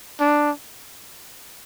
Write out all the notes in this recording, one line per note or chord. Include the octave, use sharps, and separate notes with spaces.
D4